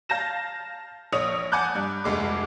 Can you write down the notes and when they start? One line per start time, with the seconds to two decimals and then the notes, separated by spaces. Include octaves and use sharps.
0.09 F5 A5 G6 A#6 E7
1.13 A#1 C#5 D#6 F7
1.52 F#5 G#5 A5 D6 F#6 G6
1.75 G2
2.04 F1 D2 G#3 D6